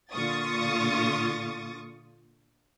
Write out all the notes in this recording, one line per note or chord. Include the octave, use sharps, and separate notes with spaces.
A#2 D3 F4 C#6 D#6 A6